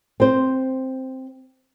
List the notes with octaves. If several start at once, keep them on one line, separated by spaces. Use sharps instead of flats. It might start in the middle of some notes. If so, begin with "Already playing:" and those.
C4 C5